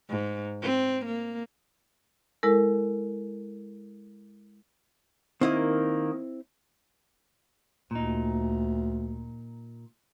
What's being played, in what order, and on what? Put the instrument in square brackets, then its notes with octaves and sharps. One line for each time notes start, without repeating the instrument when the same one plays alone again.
[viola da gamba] G#2
C4
A#3
[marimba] G#3 E4 A4 A#4
[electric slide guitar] D#3 A#3 [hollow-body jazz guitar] C4 E4 D#5
[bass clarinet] D2 [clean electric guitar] A#2 D#4